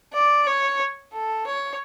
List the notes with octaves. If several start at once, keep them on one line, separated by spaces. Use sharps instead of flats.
D5
C#5
A4
C#5